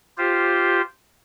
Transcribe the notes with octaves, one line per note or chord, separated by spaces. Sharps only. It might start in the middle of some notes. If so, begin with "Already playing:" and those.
F4 G4 C5